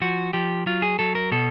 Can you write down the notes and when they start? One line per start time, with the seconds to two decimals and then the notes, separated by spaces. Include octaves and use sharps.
0.01 F3 F#4
0.33 F3 G4
0.66 F#3 F4
0.82 G#4
0.99 F#3 A4
1.15 A#4
1.32 B2 A4